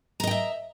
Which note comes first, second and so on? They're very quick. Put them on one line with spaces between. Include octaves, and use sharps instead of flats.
A#5 D#5 G5 E5